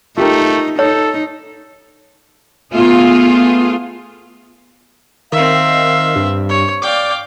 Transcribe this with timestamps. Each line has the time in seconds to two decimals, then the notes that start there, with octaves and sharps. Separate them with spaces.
0.18 A3 D#4 F4 G4 A#4
0.79 D#4 A4 C#5
2.73 A3 B3 F4 G#4
5.32 D#3 C4 E5 F5
6.16 G2
6.49 C#5
6.82 D5 F5 G5 D6